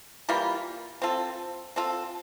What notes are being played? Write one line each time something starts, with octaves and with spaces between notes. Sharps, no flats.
E3 G3 A#3 F4
C4 F4 A4
C4 F4 A4